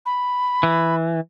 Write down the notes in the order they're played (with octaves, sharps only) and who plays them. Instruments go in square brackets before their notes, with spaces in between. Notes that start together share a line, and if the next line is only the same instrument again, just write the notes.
[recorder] B5
[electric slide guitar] E3